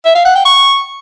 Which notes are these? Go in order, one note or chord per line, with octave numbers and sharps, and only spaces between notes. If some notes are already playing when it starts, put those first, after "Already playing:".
E5
F5
F#5
G5
C#6